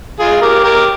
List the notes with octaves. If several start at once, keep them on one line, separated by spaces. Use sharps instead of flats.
F4 G#4
G4 A#4
G4 A#4